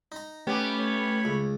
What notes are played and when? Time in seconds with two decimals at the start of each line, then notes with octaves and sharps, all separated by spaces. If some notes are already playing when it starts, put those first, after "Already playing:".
0.12 D#4 A#5
0.47 A3 B3 C#4 G4 B5
0.79 C#5
1.25 C#2